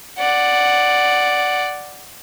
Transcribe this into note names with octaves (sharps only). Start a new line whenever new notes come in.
D5 F#5